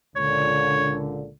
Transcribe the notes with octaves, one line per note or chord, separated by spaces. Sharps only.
C#2 A#2 D3 C#5